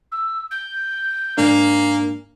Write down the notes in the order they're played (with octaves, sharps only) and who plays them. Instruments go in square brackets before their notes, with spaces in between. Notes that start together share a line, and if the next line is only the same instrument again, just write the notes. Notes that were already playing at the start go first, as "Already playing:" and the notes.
[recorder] E6
G6
[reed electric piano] G#2 D4 [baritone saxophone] A#3 [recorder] G#5